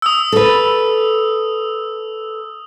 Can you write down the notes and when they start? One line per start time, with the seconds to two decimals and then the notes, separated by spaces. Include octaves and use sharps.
0.02 D#6 E6
0.32 A4 B4